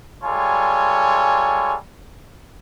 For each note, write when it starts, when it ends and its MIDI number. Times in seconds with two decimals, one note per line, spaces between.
0.24 1.76 55
0.24 1.76 56
0.24 1.76 65
0.24 1.76 69
0.24 1.76 73
0.24 1.76 80